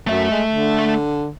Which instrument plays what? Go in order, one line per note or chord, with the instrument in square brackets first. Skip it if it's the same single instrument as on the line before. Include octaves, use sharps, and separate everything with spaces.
[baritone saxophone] F#2 [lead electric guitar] A3 E5
[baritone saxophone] G#3
D3